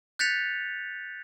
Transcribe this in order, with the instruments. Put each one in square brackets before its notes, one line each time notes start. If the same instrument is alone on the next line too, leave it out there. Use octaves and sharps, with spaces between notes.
[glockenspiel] F#6 G6 A6 B6 C#7 F7